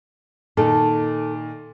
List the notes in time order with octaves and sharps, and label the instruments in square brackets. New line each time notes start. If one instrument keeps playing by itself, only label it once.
[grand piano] A#2 D#3 [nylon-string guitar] D#4 A4